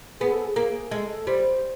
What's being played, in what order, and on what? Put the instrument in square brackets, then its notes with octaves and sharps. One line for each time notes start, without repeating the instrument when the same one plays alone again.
[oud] B3 [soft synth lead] G#4
[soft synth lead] A4
G#4
[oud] A#3
[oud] G#3 [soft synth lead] A4
[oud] G3 [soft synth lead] C5